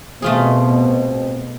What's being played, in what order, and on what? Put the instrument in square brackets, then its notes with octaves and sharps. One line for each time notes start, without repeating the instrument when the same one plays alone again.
[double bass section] B2 [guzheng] A3 F4 G#4 [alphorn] C4